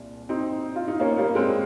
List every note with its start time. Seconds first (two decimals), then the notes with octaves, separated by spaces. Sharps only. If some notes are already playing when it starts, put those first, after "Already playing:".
Already playing: C2 A#2
0.29 C4 D#4
0.76 F4
0.88 D#4
1.00 A#3 C#4
1.18 G3 A#3
1.35 G#3 C4